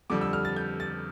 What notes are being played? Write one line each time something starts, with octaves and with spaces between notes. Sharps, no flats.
F2 D3 G3 D6
E6
F6
A6
G6
A6